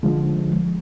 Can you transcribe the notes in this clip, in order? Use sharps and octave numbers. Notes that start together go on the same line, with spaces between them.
D3 F3 G#3